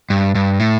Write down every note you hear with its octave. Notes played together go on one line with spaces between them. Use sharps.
G2
G2
A2